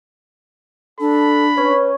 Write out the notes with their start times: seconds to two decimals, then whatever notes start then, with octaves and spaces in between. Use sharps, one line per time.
1.00 D4 A4 B5
1.57 C#4 B4